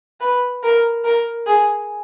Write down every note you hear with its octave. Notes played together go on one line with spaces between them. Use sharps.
B4
A#4
A#4
G#4